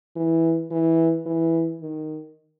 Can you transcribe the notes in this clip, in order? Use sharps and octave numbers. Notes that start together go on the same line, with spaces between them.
E3
E3
E3
D#3